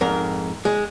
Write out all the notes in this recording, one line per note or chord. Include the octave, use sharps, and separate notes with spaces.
F2 G#2 A#4
G#3